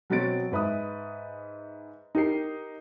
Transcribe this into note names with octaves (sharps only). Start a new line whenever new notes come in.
B2 F#3 B3 C4 A6 D7
G#2 B4 E5 D#6
D#4 G4 A#4 C7